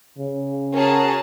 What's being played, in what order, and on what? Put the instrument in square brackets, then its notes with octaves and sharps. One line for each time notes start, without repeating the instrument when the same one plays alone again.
[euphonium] C#3
[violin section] C#4 G#4 A5 [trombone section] F#4 A#4